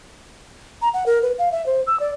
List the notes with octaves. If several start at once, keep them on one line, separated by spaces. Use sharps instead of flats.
A#5
F#5
A#4
B4
F5
E5
C5
E6
D5